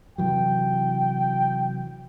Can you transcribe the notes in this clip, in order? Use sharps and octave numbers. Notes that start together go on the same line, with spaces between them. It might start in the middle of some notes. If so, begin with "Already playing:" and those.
C3 E3 F#3 G5